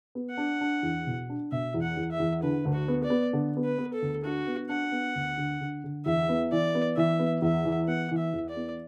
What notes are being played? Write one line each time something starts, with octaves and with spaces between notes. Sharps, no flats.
B3
F#5
D4
D4
E2
B2
D4
B2 E5
E2
F#5
E2
E5
E2
D3 B4
D2
F#4
B3
D5
B3
D3
B3
B4
B3
A4
D2
D4 F#4
B3
D4 F#5
B3
D2
D3
D3
D3
E2 E5
B3
E3 D5
B3
E3 E5
B3
E2 E5
E3
B3 F#5
E3
E5
E2
D5
B3